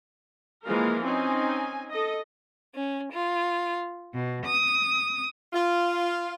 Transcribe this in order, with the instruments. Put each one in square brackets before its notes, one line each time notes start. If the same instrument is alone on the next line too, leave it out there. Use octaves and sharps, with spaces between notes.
[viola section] E3 F3 G#3 A#3 A#4 F5
C4 C#4 D#4 G#5
A4 D#5
[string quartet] C#4
F4
B2
D#6
[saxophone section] F4